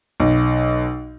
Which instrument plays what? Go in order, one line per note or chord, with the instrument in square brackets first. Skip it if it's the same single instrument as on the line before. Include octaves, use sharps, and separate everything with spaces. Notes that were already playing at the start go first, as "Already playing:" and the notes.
[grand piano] B1